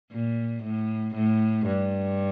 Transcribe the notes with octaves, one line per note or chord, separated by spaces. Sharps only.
A#2
A2
A2
G2